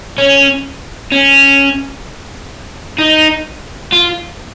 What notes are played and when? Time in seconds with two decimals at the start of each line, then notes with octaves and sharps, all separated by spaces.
0.18 C#4
1.12 C#4
2.98 D#4
3.93 F4